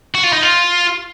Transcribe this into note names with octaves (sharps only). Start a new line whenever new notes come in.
F#4
F4
D#4
F4